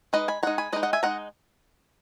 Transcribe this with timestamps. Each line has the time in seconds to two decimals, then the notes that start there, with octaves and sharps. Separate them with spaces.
0.13 G#3 D#4 B4 D#5
0.28 G#5 B5
0.43 G#3 D#4 F#5 A#5
0.58 G#5 B5
0.72 G#3 B4 D#5
0.76 D#4
0.83 D#5 F#5
0.93 E5 G#5
1.03 G#3 D#4 F#5 A#5